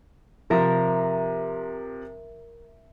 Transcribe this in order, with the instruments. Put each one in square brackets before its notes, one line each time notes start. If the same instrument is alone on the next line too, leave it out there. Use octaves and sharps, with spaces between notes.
[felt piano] C3 F3 [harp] A#4 E5 A#5